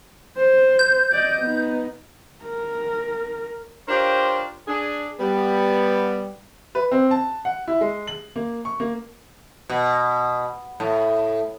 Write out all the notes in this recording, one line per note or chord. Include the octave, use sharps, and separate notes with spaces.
C5
G6
D5 D#5
B3 D#4
A#4
D4 F4 G4 A#4 C5 C#5
D4 G#4
G3 B3
B4
C4
A5
F#5
E4
G#3
F#7
A#3
C#6
A#3
B2
A2